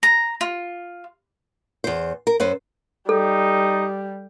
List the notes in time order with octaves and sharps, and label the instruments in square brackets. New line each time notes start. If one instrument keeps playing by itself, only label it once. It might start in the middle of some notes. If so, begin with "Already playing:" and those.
[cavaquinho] A#5
F4
[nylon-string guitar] E2 C5
A#4
F#2 B4 C5
[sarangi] G3 [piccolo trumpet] D#4 [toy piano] A4